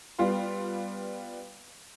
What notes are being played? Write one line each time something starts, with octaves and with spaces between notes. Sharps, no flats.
G3 B3 F4 F5 C6